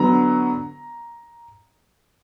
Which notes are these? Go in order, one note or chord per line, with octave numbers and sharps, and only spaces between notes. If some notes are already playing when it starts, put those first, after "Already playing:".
Already playing: D3 F#3 B3 A#5